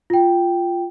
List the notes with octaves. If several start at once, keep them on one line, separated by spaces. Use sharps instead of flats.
F4 G5